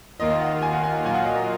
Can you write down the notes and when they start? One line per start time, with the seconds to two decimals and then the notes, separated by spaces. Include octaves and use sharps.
0.20 D#2 D#3 A#3 F4 D#5
0.41 F#5
0.62 G#5
0.73 F#5
0.83 G#5
0.94 F#5
1.04 A#2 F#3 A#3 F4 G#5
1.14 F#5
1.25 D#5
1.35 D#5